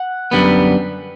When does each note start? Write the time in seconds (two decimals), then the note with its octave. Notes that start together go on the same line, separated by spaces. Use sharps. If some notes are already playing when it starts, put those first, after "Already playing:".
Already playing: F#5
0.31 F#2 D3 G3 B3